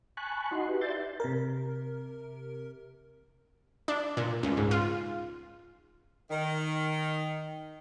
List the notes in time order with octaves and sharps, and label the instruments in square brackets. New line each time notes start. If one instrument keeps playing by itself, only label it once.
[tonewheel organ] G#5 A5 B5 C#6 F#6
D#4 E4 F#4 D#5 F#5 C6
F#4 G4 B4
D5 E5 C6 G6 A6
[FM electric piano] C3 A#4
[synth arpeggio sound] D4
A#2
C#2
G#2
F4
[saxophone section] D#3